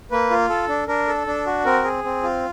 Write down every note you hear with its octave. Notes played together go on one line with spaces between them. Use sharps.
A#3 B4
F4
A4
D4
D4 A#4
A4
D4
F#4
C4 A#4
G#4
C4
F4